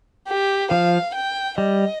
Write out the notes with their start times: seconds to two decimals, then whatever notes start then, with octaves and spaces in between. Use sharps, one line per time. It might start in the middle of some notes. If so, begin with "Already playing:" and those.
0.28 G4
0.71 F3 F5
1.15 G5
1.58 G3 D#5